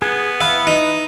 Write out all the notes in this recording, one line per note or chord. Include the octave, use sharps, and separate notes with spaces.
B3 G#4
E4 B4 E5 F5
D#4